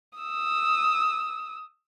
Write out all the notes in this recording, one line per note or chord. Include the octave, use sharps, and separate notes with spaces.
D#6 E6